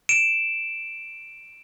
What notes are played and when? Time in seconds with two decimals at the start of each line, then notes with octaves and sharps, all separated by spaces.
0.09 D7 E7